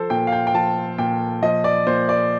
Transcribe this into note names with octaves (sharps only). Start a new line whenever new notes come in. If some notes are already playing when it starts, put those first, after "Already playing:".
Already playing: F3 A4 C5
A#2 G5
F5
G5
G5
F3 A5
A#2 G5
F3 D#5
D5
A#2 C5
D5